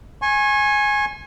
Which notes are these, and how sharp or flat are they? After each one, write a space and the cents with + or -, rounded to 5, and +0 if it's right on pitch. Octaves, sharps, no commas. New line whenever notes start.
G#5 +0 C#6 -40